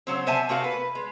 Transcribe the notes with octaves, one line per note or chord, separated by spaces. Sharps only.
C#3 F#3 C4
C3 C5 E5 G#5 A5
C3 A3 F#4 A#4 F5
B4
G#3